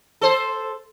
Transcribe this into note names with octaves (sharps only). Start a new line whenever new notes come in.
A4 C5